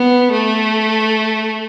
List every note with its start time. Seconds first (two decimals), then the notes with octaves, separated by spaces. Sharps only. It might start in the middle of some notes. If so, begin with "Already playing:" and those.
Already playing: B3
0.32 A3